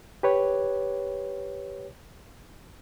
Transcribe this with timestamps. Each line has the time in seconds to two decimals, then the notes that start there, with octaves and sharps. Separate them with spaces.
0.23 G4 B4 C#5